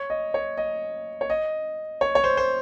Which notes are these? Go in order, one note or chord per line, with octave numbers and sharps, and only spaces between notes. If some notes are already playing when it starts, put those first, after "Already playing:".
Already playing: C#5
D#5
C#5
D#5
C#5
D#5
C#5
C#5
C5
C5